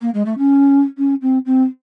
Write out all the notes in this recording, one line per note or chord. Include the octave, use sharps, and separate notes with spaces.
A#3
G#3
A3
C#4
C#4
C4
C4